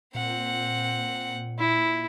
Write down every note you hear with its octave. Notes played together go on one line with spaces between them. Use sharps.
A#2 C4 F#5
E4